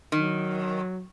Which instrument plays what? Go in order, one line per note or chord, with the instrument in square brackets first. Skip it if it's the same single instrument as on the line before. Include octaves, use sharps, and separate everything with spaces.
[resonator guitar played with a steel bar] D#3 [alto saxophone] F#3